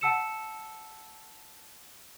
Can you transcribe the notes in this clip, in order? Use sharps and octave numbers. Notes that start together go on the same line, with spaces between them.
F#5 A5 E6 C#7 E7